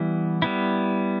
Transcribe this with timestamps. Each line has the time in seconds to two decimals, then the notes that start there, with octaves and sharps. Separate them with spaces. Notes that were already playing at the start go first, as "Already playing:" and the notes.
Already playing: E3 G3 B3 E4
0.42 G3 B3 E4